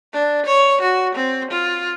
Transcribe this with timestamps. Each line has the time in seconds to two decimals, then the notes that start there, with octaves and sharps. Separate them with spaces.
0.13 D4
0.46 C#5
0.82 F#4
1.14 C4
1.51 F4